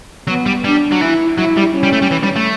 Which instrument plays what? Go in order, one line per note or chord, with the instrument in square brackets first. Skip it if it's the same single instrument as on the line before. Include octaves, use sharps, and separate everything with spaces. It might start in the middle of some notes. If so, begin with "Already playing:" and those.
[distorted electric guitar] F#3 [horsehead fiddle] B3
[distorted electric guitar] G3
[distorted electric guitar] G3 [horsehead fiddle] D4
[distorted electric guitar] F#3
[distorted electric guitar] E3 [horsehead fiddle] E4
[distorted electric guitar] F#3 [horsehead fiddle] E4
[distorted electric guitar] G3
[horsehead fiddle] C#4
[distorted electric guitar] G3
A3
G3
E3
G3
A3